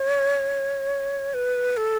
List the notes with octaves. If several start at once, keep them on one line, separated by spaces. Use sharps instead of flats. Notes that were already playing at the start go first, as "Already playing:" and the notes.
Already playing: C#5
B4
A4